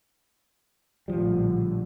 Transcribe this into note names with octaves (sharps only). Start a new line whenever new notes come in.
A#1 A2 D3 F3 G3